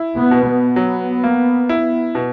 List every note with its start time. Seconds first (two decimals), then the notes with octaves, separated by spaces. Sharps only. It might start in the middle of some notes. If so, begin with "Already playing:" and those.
Already playing: E4
0.15 B3
0.31 B2
0.46 B3
0.76 F#3
1.24 A#3
1.69 E4
2.15 B2